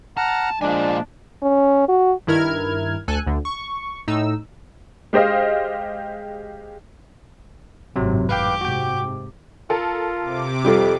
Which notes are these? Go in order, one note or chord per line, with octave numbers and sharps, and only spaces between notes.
F#5 A5 A#5 F6
A#2 F3 G#3 D4 G#5
C#4
F#4
G2 D#3 E4 A#4 F6 G#6
D2 A4 G#5 F#6
D2 D3
C#6
A2 D#4 E6
G#3 G4 C5 D#5 F5
G#1 F#2 A2 C3 F#3
G4 B4 F5 G5 D6
G#2 C3 F#4 G5
F4 A4 A#4
C3 D6
F2 G3 C4 F4 G4 A4